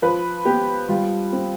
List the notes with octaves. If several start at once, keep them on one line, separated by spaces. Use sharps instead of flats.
F3 B4
B3 G4
G3 F4
C4